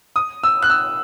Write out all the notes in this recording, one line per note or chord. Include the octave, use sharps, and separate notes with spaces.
D#6
E6
F#6
E6